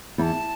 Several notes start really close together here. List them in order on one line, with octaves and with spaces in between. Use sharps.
E2 B5 A5